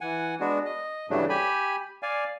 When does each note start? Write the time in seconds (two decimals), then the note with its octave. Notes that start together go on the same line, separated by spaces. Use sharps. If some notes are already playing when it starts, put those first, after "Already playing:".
0.01 E3 F#5 G#5
0.40 G#3 B3 D4 F#4
0.65 D#5
1.10 G2 C#3 E3 F#3 A3 D4
1.29 G4 G#5 B5
2.03 D5 F5 G#5